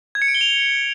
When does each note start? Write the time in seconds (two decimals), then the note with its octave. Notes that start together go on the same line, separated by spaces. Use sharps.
0.15 G#6
0.22 C#7
0.28 D7
0.35 G7
0.41 F7